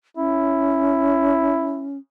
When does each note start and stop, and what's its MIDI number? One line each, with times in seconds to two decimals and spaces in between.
0.17 1.98 61
0.17 1.88 64